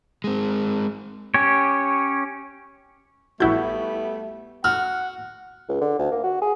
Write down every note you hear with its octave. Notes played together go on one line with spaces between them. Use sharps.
G#3 C4
C#4 G4 C#5
A#1 G3 A3 B3 E4 F#4 E5 G6
F#4 F#5 F6
C#2
D3
D2
A#3
F#4
G#4